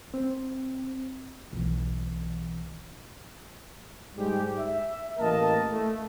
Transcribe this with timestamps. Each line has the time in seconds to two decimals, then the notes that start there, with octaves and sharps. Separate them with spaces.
0.14 C4
1.53 B1 E3
4.17 G#2 G3 G#3 G4
4.60 E5
5.19 A1 A#3 A#4 D#5 A5
5.71 A3